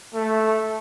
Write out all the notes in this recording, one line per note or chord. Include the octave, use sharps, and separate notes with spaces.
A3